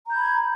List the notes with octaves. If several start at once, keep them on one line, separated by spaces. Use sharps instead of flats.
A#5 B5 G6 G#6